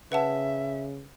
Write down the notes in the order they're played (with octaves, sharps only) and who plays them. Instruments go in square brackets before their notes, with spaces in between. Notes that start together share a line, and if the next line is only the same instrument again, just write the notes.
[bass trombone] C#3 [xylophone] B4 F#5 A5 [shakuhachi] E5